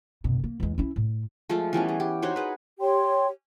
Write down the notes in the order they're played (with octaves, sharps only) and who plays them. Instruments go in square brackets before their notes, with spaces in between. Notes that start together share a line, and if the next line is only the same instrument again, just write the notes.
[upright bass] F#1 B2
A#3
E2 G#3
C#4 E4
A2
[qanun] F3 G#3 A3 F4
E3 G3 B3 C#4
G#4
G4
D#4 F#4 C5 C#5
G#4 B4
[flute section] G4 C#5 G5 C6